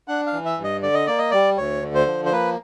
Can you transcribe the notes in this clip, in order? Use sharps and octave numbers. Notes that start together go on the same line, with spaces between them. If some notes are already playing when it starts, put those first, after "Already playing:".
D4 F#5
F5
E3
E5
G2
D#5
D3 D5
D#5
A#3 D5
D#5
G3 D5
D2 C#5
D3
C5
F3
C5
A#3 B4